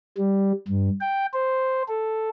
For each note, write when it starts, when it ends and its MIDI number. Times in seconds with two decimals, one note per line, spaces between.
0.18 0.52 55
0.68 0.90 43
1.01 1.26 79
1.33 1.83 72
1.89 2.30 69